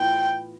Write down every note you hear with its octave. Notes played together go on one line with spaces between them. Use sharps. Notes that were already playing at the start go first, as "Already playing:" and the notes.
Already playing: A2 E3 B3 F4 G5